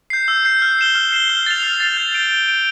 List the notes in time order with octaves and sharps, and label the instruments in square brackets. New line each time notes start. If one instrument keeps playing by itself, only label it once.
[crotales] G6 C7
E6
G6 C7
F6
C7 E7 G7
F6
C7 E7 G7
F6
A6 C7 F7
F6
A6 C7 F7
G6
D7 G7
G6
D7 G7